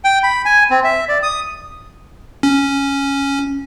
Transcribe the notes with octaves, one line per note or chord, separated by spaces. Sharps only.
G5
B5
G#5
C4
E5
D5
D#6
C#4